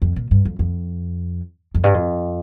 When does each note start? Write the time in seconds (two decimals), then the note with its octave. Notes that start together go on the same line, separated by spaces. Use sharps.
0.02 F2
0.16 A#2
0.31 G2
0.45 F2
0.59 F2
1.75 F2
1.84 G2
1.94 F2